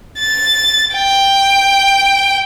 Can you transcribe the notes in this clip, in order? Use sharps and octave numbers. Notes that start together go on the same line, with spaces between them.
A6
G5